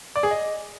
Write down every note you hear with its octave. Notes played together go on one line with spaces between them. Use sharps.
D5
G#4
D#5